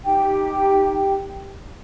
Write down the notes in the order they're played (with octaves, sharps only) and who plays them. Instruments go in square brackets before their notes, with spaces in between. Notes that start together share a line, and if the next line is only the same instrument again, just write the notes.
[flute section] D#4 G4 G5